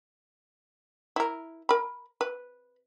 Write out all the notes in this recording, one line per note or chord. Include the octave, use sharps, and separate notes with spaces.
E4 A#4
A#4 B5
B4